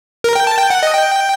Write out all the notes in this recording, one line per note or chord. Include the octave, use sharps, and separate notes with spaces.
A#4
G5
A5
G5
F#5
D#5
G5